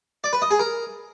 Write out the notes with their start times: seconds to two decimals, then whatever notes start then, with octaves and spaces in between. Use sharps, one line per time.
0.24 D5
0.33 B4
0.42 D#5
0.51 G#4
0.60 A#4